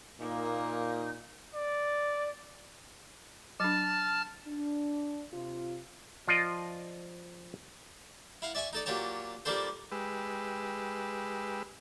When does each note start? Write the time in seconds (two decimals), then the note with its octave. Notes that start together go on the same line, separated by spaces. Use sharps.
0.20 A#2 A#3 D#4
1.55 D5
3.60 F#3 D4 A5 F6 A6
4.46 D4
5.34 C3 F4
6.28 F3 F4 D5 D#5
8.42 E4 F5 F#5
8.55 D5 E5 G#5 C#6 D6
8.73 D#4 A4 D5
8.86 A#2 F#3 G4 C#5 A5
9.45 F3 G3 A#3 D4 A4 C5
9.92 G#3 G4 B4 E6